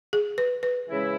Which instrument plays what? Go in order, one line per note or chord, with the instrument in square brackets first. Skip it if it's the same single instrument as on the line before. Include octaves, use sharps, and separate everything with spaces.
[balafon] G#4
B4
B4
[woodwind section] C#3 E3 G#3 C#4 E4